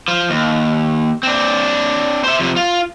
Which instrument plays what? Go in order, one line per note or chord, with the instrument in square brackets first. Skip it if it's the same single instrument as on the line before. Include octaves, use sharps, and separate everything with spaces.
[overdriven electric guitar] F3
D#2
C4 D4
C5 E5
C3 F3
F4